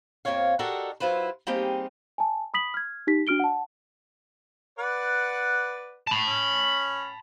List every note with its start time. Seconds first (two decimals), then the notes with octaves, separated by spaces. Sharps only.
0.25 F2 C3 A#3 C4 C#5 F5
0.59 D4 F#4 G4 A4 A#4 D#5
1.00 F#3 E4 F4 B4 C5
1.47 G3 A#3 C4 D#4 G4 G#4
2.18 G#5 A5
2.54 B5 D#6 B6 F#7
2.74 F6 G#6
3.07 D#4 G4 B6
3.27 D4 F#4 F6 D7 G7
3.40 F#5 A5
4.79 B4 D5 F#5
6.07 A5 B5
6.28 C#4